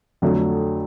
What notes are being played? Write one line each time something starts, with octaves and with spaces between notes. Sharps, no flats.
F2 D3 F#3 A3